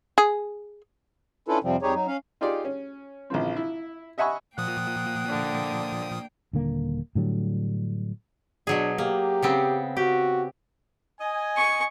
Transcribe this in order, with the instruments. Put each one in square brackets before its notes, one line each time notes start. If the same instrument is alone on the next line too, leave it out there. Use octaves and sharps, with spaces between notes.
[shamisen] G#4
[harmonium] C#4 D4 E4 F4 A4 B4
F2 C3 F3 G3 C4
F2 G3 D#4 G4 G#4 C#5
F#3 D#4
C#4 F5
[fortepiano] D#4 F4 G4 G#4 D5
C#4
A#1 C#3 E3 C4
E4
D#5 E5 F#5 G#5 B5 C#6
[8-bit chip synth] A#2 F3 D#6 [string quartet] A#3 G5 [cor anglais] F#5
[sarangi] D3
[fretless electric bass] D#1 D3 A#3
A2 D3 F#3 G3
[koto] B2 F#3 G#4 [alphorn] D4
[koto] A#3 [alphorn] G4
[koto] C#3 B3 C4
[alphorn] F#4 [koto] G4
[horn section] D#5 G#5
[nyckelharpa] C#6